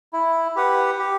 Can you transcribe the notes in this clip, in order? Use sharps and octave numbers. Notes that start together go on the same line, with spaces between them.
E4
G4 B4 F#5
G4